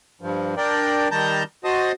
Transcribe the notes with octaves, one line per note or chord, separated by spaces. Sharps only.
G2 F3
D4 A#4 D5 G5
D#3 G3 A5 A#5 G6
F#4 C5 D#5 A5 D#6